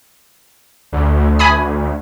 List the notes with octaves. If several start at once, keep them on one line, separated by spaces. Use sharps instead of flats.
D2
G#5 B5 D#6